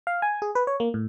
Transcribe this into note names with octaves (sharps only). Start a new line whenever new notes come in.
F5
G#5
G#4
B4
C#5
A#3
A2